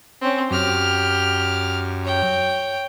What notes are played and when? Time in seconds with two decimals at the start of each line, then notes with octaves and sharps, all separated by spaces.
0.21 C4 C#4
0.51 F#2 G4 F6
2.04 C#5 G5